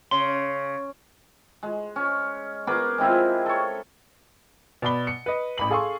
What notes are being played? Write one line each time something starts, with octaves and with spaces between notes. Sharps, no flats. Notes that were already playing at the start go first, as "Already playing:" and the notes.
C#3 C6
G#3
C#4
B3 G#4 A#4 D6
G#3 C4 E4 F4
A4 C#5
B2 D5 B5 G7
C#7
B4 D#5
A1 B5 F#7
G#4 A4 F5 G#5 C6 C#6